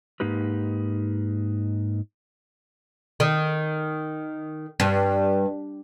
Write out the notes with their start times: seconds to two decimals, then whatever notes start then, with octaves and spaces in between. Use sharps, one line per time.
0.20 G#2 A#3 D#4 G4 B4
3.20 D#3
4.80 G2